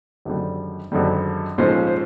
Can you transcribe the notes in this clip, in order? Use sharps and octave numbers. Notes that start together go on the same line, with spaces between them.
G#1 F#2 D3 G3
G#1 F#2 D3 G3
A#1 G#2 F3 A3 C#4 C5
C5